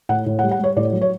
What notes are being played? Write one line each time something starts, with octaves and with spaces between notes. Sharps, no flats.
A2 F#5
A2
F#5
G3
F#5
G3 C#5
A2 D5
F#3
C#5